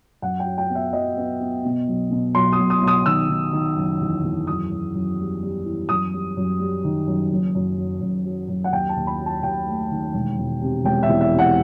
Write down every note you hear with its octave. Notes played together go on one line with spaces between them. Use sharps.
F#2 F#5
G5
F#3
G5
B3
E5
F#3 D#5
B3
B3
B2
B1
B2
B1 C6
D#6
B1
D#6
B1
D#6
D#3 E6
D#3
D#3
F#1
E2
E2
F#2 D#6
F#2
F#2
G3
G3
E3
F#2 D#6
G3
F#2
G3
D#3
F#2
F#1
F#2
F#3
F#2
F#3
F#2
F#5
D#2 G5
A5
D#2
B5
F#3
A5
D#2 G5
A3
D#3
E1
E1
C3
E1 G5
E5
E2
E5
C3
F#5